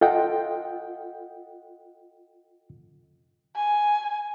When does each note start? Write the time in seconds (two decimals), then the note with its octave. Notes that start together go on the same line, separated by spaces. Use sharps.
0.01 F4 A4 D#5 F#5 G5
3.56 G#5